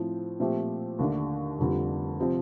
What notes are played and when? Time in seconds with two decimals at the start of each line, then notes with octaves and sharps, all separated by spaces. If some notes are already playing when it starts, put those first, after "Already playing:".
Already playing: A2 F3 C4
0.40 A#2 F3 A3 C4 G4
0.99 D#2 D3 A3 D4
1.59 F1 F2 D3 G3
2.20 C3 F3 C4